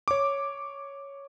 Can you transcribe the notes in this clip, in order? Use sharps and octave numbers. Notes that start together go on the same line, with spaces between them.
C#5 D6